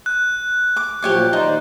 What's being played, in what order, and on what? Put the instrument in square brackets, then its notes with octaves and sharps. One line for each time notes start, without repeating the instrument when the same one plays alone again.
[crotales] F#6
[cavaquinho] D6
[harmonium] A#2 F3 F#3 [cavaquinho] G4 C#5 D6
[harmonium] D#2 C5 D5 [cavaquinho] D#4